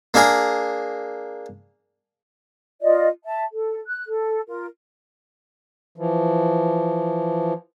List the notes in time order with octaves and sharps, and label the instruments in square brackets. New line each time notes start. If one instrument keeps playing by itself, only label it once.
[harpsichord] A#3 D4 G#4 A#4
[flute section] F4 D5 D#5
E5 A5
A4
F#6
A4
F4 A#4
[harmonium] E3 F3